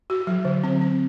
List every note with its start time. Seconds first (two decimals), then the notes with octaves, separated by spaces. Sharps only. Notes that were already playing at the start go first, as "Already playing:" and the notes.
0.10 F#4
0.27 F#3
0.45 D3
0.63 C4
0.81 C4